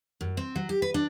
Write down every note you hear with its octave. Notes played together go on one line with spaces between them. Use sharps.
F#2
C4
F#3
G4
B4
D4